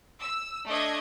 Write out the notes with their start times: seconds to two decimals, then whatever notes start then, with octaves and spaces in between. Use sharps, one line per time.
0.21 E6
0.68 A3 D4 D#5 D#6 G#6